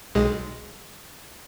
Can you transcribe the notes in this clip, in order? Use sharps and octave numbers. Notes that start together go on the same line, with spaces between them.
B1 G#3